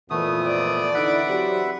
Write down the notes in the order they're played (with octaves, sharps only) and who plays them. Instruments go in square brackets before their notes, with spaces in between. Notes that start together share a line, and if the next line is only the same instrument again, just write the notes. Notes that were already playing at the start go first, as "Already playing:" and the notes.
[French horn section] F2 A#2 [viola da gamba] E3 [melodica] A3 B3 D#6
[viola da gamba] D5
[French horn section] D3 D#4 E4 [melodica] B4 E5 F#5
[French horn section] F#3 C4 G4